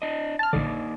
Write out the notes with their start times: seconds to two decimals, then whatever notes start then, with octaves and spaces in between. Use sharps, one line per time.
0.02 D4 D#5
0.39 A5 F6
0.53 A#1 D3 A#3 D#4 D5